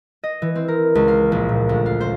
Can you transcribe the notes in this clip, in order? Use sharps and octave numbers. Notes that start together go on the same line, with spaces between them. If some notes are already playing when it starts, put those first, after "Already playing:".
D#5
E3
C4
A#4
C#2
F5
A#1
A#2
D2
F5
C5